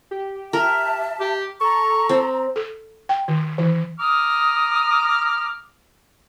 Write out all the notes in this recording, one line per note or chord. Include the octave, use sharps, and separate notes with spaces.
G4
A#4 E5 A5
G4
A4 A#5 C#6
C4
A4
G5
D#3
E3
A#5 D6 D#6 F6